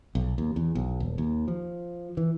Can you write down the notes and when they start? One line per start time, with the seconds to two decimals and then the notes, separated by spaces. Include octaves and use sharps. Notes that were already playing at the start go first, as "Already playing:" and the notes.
0.15 B1
0.38 D#2
0.56 E2
0.75 B1
1.00 D#1
1.18 D#2
1.48 F3
2.17 E3